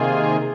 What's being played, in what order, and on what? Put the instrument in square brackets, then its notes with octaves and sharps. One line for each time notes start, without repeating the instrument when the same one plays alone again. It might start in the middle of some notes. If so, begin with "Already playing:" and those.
Already playing: [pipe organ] C3 D#3 A#3 F4 G#4